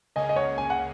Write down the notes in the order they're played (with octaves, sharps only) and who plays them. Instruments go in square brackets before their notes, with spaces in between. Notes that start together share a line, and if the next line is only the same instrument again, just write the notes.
[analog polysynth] C#2 C#3 A#3 C#4 G#4 [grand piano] D#5 G#5
[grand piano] D#5
C#5 F#5
G#5
F#5